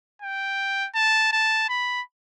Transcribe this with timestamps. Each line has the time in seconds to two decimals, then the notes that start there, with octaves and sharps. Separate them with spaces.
0.22 G5
0.95 A5
1.33 A5
1.69 B5